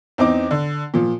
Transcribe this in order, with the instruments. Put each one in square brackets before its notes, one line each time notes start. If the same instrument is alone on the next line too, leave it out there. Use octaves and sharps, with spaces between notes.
[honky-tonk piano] E2 C4 D#4 D6
D3
A#2 F3